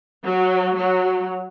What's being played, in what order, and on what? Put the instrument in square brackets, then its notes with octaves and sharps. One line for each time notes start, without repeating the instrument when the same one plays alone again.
[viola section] F#3
F#3